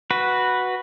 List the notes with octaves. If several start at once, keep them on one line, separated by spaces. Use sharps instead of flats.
F#4 B4